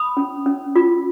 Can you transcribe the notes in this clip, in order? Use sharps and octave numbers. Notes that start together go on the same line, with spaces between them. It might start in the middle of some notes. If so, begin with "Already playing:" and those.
Already playing: B5 D#6
C#4
C#4
F4